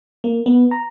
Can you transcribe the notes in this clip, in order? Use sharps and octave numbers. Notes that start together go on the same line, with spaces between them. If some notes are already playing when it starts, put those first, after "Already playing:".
A#3
B3
A#5